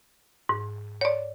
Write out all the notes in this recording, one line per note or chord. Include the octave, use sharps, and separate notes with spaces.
G#2
C#5 D5